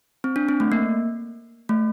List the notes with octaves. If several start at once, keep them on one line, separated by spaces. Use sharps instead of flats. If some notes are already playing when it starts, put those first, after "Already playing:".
C4
D4
C4
A3
A#3
A3